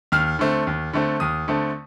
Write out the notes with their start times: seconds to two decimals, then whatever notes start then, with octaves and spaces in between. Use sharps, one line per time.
0.12 D#2 F6
0.39 D3 A3 C4
0.67 D#2
0.93 D3 A3 C4
1.20 D#2 D#6
1.48 D3 A3 C4